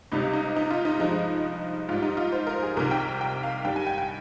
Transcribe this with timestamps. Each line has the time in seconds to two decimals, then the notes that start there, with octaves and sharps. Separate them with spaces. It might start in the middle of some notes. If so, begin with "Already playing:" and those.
0.12 C#2 C3 G3 D#4
0.33 D#4
0.56 D#4
0.70 F4
0.85 D#4
1.00 G2 F3 G#3 D#4
1.89 G#2 G3 F4
2.03 D#4
2.17 F4
2.32 C5
2.47 A#4
2.62 G#4
2.77 C2 C3 D#3 A#4
2.91 G5
3.21 G5
3.43 F5
3.65 G2 D#3 G3 G5
3.76 G#5
3.87 G5
3.98 G5